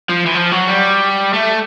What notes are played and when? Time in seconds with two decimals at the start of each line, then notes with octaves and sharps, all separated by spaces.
0.09 F3
0.26 E3
0.35 F3
0.51 F#3
0.67 G3
1.33 A3